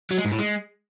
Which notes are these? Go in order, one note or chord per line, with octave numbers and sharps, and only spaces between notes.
F#3
G#3
G#2
A2
G#3